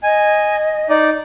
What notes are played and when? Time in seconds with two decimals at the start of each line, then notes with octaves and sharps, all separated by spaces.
0.03 D#5 G#5
0.90 D#4 D5